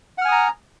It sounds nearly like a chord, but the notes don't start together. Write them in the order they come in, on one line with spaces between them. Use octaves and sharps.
F#5 F6 G#5 D#6 A#5